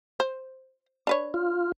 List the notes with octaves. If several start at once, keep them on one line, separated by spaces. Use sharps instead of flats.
C5
D4 B4 C#5
F4